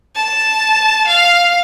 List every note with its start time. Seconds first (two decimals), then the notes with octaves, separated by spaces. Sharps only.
0.16 A5
1.07 F5